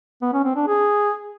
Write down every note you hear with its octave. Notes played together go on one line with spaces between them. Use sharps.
B3
C#4
C4
D4
G#4